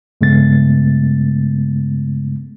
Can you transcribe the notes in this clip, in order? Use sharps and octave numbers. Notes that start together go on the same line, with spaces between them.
G2 C#3 G#3 A3 B3 A6